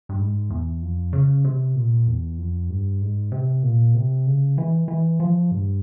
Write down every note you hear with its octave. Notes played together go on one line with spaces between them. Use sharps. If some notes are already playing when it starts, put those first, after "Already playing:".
G2
G#2
E2
F2
C#3
C3
A#2
E2
F2
G2
G#2
C3
A#2
C3
C#3
E3
E3
F3
G2